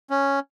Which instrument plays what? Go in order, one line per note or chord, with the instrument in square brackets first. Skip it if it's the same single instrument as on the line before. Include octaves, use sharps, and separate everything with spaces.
[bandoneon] C#4